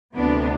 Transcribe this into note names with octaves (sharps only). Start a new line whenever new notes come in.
D2 C3 E3 B3 D4